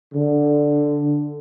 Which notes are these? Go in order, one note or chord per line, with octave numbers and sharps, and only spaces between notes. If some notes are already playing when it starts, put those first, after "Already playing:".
D3